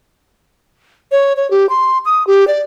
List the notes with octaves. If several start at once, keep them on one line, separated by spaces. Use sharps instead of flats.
C#5
C#5
G4
C6
D#6
G4
D5